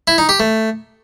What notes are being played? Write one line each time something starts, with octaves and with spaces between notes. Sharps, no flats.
E4
D#4
G4
A3